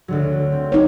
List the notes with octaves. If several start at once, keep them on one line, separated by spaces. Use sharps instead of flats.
D2 D3 F#3
C4
D#4 C#5